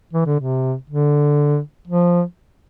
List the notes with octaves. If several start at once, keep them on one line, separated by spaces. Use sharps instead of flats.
E3
D3
C3
D3
F3